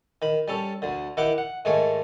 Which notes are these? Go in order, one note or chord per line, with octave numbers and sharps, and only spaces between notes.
D#3 B5
G3 C#4 A4
D2 D3
D#3 E4 G4 F#5 G5 D6
F#5
G#2 D#3 A3 C#5 G#5